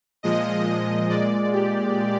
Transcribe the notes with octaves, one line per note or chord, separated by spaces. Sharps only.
A#2 F3 G#3 D#5
A#2 G#3 D5
G4